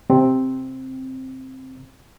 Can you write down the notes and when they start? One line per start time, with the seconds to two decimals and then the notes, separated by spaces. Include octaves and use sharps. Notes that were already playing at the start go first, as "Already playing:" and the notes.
0.10 C3 C4